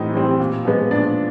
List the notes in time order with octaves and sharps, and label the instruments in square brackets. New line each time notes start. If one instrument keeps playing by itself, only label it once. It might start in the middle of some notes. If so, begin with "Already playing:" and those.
Already playing: [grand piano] A2 E3 G3 C4 D#4
E3 G3 C4
A#2
F3 G#3 B3
A#2 D4 D5